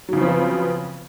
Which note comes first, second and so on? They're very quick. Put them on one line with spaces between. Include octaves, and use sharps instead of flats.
F#3 C#3 F3 C4 B3